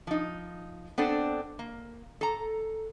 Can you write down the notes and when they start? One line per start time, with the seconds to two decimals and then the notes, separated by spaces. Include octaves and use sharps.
0.07 F3 D#4
0.98 B3 C4 D4 A4
1.59 A#3
2.21 A4 A#5